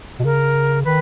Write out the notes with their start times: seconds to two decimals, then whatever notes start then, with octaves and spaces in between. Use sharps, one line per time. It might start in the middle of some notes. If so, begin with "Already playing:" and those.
0.20 B2
0.24 C#3 A#4
0.85 D#3 B4